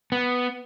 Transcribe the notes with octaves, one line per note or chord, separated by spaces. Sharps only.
B3